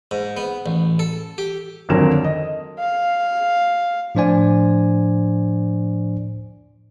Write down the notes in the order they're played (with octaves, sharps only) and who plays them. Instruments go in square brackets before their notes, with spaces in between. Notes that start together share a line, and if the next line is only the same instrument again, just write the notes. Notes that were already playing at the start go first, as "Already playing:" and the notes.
[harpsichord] G#2
B3
A1
A4
G4
[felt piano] G#1 F2 D3 F#3 A#4 E7
D#5
[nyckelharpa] F5
[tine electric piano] A2 F3 D4 C5 D5 G#5